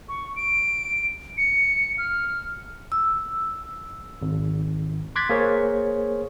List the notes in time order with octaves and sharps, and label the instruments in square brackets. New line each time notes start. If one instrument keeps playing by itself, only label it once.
[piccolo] C#6
D7
C#7
F6
[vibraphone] E6
[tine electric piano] G#1
C6 D6 F#6 G#6 A6 B6
A#3 G#4 A#4 C5 C#5